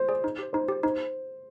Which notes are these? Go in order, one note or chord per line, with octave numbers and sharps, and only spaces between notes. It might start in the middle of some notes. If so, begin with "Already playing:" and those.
Already playing: C5
G#4 D5
D#4
G4 C5
D#4 C5
G4 C5
D#4 C5